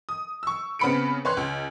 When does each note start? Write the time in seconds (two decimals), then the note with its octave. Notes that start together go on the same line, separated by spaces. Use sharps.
0.09 D#6
0.43 C#6 E6
0.79 C#3 B3 C4 B5 C#7 D7
1.25 B4 C#5 C6 F#6
1.37 C#2